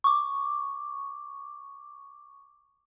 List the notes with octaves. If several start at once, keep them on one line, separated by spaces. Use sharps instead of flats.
C#6 D6